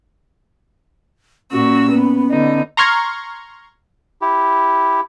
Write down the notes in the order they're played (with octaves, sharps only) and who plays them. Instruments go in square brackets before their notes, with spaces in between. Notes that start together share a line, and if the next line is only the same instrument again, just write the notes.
[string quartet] A#2 F#4 E6 [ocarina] C#4
[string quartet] B3
D3 B3 D#4
[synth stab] A#5 C6 C#6 F6 G#6
[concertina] E4 G4